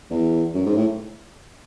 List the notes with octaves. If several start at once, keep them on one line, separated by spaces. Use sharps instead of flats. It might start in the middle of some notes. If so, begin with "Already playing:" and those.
E2
F#2
G#2
A2